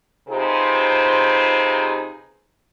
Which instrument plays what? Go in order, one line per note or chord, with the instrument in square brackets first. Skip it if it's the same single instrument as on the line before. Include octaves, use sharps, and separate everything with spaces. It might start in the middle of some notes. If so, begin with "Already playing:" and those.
[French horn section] C3 D#4 F4 G#4 B4 C5